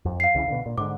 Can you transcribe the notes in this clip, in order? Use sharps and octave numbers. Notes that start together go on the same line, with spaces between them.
F2
F5 C7
C2 C#3 E3
B2 D3
A#2
G#2 D3 D6